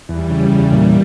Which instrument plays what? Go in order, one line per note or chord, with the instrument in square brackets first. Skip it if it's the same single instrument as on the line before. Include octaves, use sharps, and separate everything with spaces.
[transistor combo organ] E2 [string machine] G3
[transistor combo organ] C#3
E2
A#2